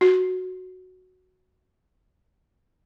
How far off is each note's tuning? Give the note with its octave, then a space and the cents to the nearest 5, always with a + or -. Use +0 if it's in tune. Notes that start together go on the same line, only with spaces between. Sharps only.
F#4 +0